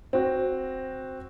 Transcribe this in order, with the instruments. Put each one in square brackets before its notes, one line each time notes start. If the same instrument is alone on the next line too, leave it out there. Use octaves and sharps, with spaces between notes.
[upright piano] C4 F#4